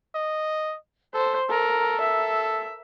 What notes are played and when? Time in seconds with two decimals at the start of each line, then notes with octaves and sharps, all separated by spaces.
0.15 D#5
1.14 A4 C5
1.50 A4 A#4
2.01 E5